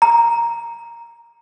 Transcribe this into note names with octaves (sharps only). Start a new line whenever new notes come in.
A#5